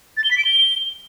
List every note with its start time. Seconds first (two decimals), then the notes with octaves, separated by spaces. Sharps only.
0.17 A6
0.24 G7
0.31 B6
0.38 D7
0.45 G7